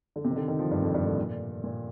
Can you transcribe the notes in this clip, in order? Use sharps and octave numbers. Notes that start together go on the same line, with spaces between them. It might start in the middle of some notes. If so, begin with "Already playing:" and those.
D3
C3
D#3
D3
D#3
F3
G2
F2
G2
A2
A#2
A#2